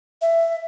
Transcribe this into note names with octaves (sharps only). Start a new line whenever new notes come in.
E5